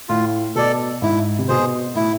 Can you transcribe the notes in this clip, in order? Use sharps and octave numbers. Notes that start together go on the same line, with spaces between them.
A2 F4
B2 A4 D5
G#2 E4
C3
B2 G#4 C5
A2 E4